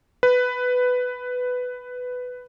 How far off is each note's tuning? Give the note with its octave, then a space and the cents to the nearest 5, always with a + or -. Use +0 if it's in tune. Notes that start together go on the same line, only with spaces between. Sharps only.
B4 +10